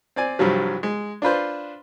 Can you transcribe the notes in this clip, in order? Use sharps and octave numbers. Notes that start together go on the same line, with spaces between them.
C4 D5 G#5
C2 G2 C3 F3 F#3
G#3
D4 F4 B4 C5